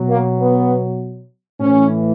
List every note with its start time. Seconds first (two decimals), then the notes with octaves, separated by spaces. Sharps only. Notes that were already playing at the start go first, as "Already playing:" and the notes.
Already playing: B2 F#3
0.09 A#3
0.39 B3
1.60 A2 E3 C#4